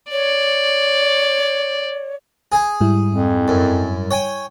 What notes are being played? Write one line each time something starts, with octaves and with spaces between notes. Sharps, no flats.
C#5 D5
G#4 G#5
G#2 G3 E4
F2
F#2
C#5 G5 G#5